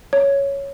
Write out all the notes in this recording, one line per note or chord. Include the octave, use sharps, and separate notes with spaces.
C#5